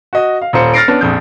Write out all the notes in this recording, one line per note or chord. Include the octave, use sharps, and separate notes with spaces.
F#4 D#5
F5
D#1 F4 C5 C#7
F6 A6 A#6 C7 D7
B3 C#4 D4
A#1 F2 G6